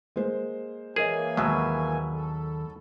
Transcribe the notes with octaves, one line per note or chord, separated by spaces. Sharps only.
G#3 A#3 C5
E3 A#3 G#4 A#4 C#5 D#5 G#5
D#2 B2 F#3 G#3 B5 E6
A4